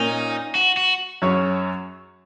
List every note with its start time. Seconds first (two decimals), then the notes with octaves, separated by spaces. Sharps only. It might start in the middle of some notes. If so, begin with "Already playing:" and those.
Already playing: A#2 A#3 C#4 D#4
0.55 F#4
0.77 F#4
1.22 F#2 F#3 C#4 G#4 C#5